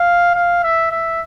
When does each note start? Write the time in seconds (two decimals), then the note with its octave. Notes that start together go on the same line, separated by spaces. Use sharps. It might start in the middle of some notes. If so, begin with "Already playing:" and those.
Already playing: F5
0.34 F5
0.63 E5
0.92 E5